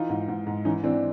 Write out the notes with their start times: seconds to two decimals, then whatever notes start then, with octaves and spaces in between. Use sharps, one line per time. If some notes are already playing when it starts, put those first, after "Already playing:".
Already playing: E3 D#4 F4
0.10 G#2
0.28 G#2
0.47 G#2
0.65 E3 C#4 D#4
0.84 E3 C4 D4